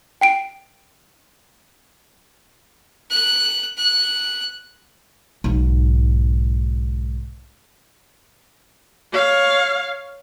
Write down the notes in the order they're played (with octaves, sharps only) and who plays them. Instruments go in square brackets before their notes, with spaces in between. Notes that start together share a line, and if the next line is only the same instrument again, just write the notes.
[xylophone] G5 C7 D7
[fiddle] F#6
F#6
[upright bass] B1 G#2
[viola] C#5 F5